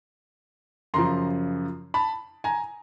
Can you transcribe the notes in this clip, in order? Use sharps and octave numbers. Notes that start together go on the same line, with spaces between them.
F#2 C#3 F3 A#5 C6
A5 B5
G#5 A#5